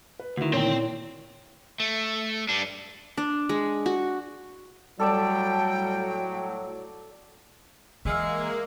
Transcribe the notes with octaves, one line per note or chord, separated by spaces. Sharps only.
B4
D2 D#3 E4 F#4
A#2 C4 E4 C#5 G5
A3
G3 D4
D4
G#3
F#4
A2 F#3 G3 A4 D5 G5 A5
E3 G#3 A#3 E5 F5